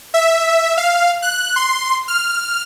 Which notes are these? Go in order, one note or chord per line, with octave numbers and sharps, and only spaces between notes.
E5
F5
F#6
C6
F6